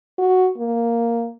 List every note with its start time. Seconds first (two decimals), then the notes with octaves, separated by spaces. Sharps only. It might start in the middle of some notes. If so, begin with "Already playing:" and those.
0.18 F#4
0.58 A#3